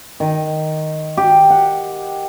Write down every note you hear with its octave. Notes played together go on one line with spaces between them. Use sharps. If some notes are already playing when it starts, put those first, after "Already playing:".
D#3
G4
F#5